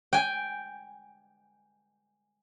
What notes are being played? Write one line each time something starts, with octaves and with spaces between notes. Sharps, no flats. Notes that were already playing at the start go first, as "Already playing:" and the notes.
G5 G#5